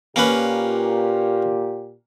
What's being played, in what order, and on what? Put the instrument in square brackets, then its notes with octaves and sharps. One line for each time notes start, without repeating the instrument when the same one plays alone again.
[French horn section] A#2 G4 [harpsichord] A#3 C#4 B4